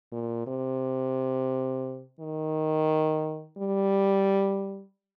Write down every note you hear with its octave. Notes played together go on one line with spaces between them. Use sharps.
A#2
C3
D#3
G3